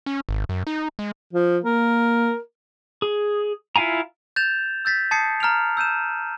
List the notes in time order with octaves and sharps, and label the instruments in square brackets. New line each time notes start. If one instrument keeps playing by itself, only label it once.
[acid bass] C#4
G#1
F#2
D#4
G#3
[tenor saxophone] F3
[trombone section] A#3 [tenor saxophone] A#4
[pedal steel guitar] G#4
E4 F4 F5 G#5 A#5
[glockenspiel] G6 A6 E7 F7
E6 G6 A6 B6
A5 D#6 G#6 A6 C7 C#7
A#5 F6 D7 F7
E6 G6 D#7 E7